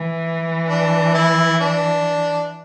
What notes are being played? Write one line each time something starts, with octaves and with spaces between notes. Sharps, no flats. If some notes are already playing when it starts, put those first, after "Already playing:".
Already playing: E3
D4
E4
D4